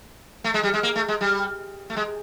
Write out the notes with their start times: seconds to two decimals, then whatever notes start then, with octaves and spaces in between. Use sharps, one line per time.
0.44 A3
0.54 G#3
0.63 G3
0.74 G#3
0.83 A#3
0.96 A3
1.08 G#3
1.21 G3
1.90 A3
1.97 G#3